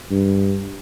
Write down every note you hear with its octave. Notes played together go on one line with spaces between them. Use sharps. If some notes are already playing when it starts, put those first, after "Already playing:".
G2